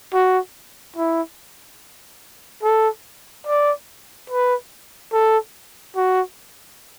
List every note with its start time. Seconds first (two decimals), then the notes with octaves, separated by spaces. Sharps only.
0.14 F#4
0.96 E4
2.63 A4
3.47 D5
4.30 B4
5.13 A4
5.96 F#4